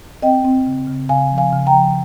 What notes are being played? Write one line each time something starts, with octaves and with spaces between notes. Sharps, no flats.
C4 D#5 G5
C4
C#3
C#3
C#3 F5 G#5
F3
F5 G#5
C#3
G5 A#5
F3